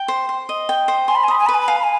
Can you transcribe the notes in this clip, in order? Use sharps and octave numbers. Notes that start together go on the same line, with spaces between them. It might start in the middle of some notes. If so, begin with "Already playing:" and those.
Already playing: G5
C5
C5
D#5
G5
C5
G#5 C6
B5
G#5
B5 D#6
G#5
B4 B5
G#5
B5
F5 G#5
B5
G#5